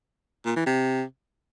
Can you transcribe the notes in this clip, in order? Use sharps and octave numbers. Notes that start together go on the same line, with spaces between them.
A#2
E3
C3